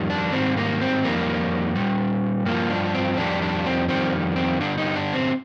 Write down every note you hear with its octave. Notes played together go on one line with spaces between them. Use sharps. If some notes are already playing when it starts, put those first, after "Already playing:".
Already playing: F2 D#3 G3
D4
G#2 D#3 G3 C4
A#3
C4
F2 D#3 G3 A#3
A#2 G3
G2 F3 A#3
D4
C4
F2 D#3 G3 D4
D4
C4
F2 D#3 G3 C4
C4
G2 D3 G3 D4
D#4
D4
C4